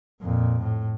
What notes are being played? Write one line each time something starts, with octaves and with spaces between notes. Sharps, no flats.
F2 A#2
A2